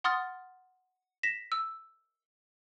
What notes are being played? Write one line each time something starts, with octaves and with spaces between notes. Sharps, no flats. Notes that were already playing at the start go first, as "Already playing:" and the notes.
F#5 C6 D#6 F6 A6
A#6 B6 E7
E6